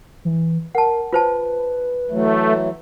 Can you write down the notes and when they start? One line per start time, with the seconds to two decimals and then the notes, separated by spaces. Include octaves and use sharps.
0.25 E3
0.75 A#4 F#5 A5
1.13 F4 B4 C5 A5
2.11 E3 F#3 A3